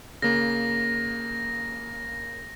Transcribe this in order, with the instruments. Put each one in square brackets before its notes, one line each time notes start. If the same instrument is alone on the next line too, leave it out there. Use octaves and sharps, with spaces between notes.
[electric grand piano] C#3 A#3 [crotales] A#6